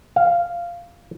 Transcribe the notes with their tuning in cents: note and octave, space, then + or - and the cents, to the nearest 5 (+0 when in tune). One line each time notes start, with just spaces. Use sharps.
F5 -10